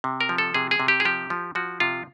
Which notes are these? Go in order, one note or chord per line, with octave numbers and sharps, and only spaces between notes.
C3
A#4
F3
A4
C3 G#4
G#4
C3
G4
G#4
F3 G4
F3
F3 F#4
C3 F4